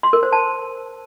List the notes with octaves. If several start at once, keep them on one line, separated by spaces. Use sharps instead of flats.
C6
A#4
C5
A5